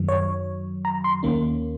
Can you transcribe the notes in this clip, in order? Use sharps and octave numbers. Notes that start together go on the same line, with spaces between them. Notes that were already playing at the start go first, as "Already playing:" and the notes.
Already playing: F#2 D#3 F#3
C#5
A#5
C6
D#2 D#3 A#3 C#4